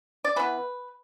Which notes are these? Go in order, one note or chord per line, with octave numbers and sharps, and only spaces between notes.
D5
E3 B3 B4